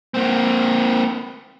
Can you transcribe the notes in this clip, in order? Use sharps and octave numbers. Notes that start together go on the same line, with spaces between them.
A#3 C4